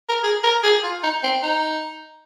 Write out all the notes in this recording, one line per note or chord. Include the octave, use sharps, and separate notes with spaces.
A#4
G#4
A#4
G#4
F4
D#4
C4
D#4